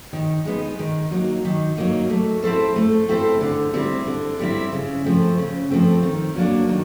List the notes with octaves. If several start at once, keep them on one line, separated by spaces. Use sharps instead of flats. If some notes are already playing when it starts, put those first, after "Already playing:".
D#3
G#3 B3 D#4
D#3
F#3 A#3 D#4
D#3
F#3 A#3 D#4
A3
C4 E4 A4 C5
A3
C4 E4 A4 C5
D3
G3 C4 E4
D3
G3 C4 E4
C#3
F3 A3 C4
C#3
F3 A3 C4
D#3
F#3 A#3 D4
D#3